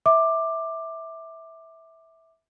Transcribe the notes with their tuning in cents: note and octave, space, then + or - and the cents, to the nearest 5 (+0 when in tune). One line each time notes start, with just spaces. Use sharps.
E5 -15 D6 +15